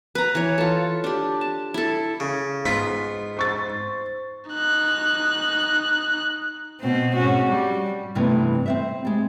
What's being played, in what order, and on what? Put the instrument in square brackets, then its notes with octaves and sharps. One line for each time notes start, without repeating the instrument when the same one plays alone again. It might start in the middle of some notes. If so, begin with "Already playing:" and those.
[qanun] B4 A#5
E3 C#5
F4 A4
D4 G4
A5
E4 A4
[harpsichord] C#3
[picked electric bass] G#2 [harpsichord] B3 F4 [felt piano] B6
[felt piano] C5 C#6 A6
[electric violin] D#4 F#6
[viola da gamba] B2 C4
G#2 C#4 F#4
G3
[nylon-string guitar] G2 C3 E3 A3 B3 D#4
C4 C5 E5
G3 G#3